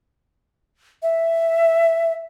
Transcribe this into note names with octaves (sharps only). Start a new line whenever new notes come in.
E5